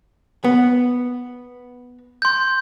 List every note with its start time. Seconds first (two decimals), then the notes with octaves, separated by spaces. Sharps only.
0.44 B3
2.22 C6 G6